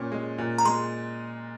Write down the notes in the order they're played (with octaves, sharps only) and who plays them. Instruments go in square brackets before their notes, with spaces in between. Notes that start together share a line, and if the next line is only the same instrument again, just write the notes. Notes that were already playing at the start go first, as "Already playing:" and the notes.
Already playing: [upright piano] A#2 C#4
G#3
A#2
[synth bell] A#5
[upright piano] G#3 [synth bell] C6